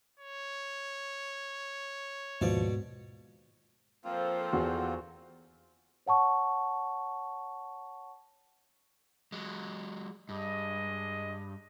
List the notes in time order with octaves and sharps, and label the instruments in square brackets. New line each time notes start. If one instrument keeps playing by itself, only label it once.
[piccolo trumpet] C#5
[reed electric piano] D#2 F3 [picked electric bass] G#2 [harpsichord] B2 D5
[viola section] F3 A4 C5 [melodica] A#3 C4 F4
[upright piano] E2 [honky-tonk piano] F#4
[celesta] C#5 F#5 A5 C#6
[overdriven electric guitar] F#3 G#3
[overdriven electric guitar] G2 [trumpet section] G#3 D#5